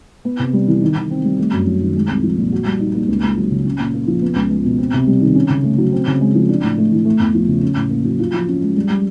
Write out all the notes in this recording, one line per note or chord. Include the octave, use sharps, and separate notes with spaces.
B3
C3
G3
E3
D#3
D#3
C4
G3
A3
F#2
F#3
D#3
G#3
C2
F3
A#2
F#4
G3
D#4
A#3
C#2
C#2
F#3
C#3
C#4
A#2
A#3
F3
B3
C#2
G#3
B2
C4
C3
G3
D#3
C#4
C#3
A3
F#3
C4
C#3
G#3
F3
D4
A2
A3
E3
A3
E2
F3
C#3
C#4
A2
A#3
F#3
F4
F3
C#4
G#3
G3
G3